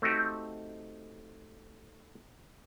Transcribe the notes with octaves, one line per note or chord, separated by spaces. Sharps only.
A3 C4 D#4 F#4 G4